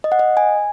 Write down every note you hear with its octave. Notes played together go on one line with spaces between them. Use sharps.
D#5
F#5
D#5
G#5